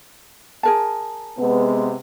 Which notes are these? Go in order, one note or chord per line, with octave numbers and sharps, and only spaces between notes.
G#4 A#4 A5
C3 G#3 B3